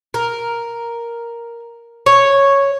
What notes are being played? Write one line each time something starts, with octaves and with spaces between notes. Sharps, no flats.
A#4
C#5